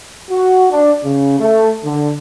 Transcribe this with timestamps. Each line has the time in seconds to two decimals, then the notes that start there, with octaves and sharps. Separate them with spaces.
0.31 F#4
0.72 D4
1.04 C#3
1.40 A3
1.84 D3